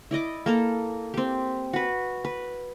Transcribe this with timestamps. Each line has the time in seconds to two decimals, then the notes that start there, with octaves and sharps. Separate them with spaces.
0.11 E4 D5 D#5 D6
0.46 A#3 A4 A#4
1.14 C4 G4
1.73 F#4 B4
2.25 B4